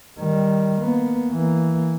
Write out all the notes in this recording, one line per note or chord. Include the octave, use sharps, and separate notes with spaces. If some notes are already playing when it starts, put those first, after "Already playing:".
D#3 G3
A#3 B3
E3 A#3